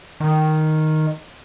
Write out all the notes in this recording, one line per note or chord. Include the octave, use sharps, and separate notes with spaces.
D#3